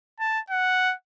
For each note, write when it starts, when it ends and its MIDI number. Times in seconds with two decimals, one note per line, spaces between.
0.20 0.40 81
0.50 0.94 78